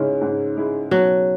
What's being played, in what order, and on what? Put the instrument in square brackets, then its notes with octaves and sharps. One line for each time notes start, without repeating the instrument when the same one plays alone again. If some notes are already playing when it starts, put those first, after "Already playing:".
Already playing: [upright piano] G#2 G#3 E4 G#4 [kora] C#3
[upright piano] G#2
G#3 E4 G#4
[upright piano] B2 [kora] F#3